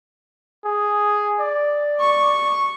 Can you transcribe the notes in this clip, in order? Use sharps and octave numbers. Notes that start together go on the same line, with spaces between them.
G#4
D5
C#6